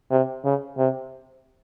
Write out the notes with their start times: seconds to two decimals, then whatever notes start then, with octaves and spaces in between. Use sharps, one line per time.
0.11 C3
0.44 C#3
0.78 C3